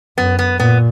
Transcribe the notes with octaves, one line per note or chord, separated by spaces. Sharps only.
F#2 B3
B3
A#2 B3